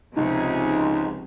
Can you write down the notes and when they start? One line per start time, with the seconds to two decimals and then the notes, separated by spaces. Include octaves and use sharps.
0.16 C#2 C3 F3 D#4 G#4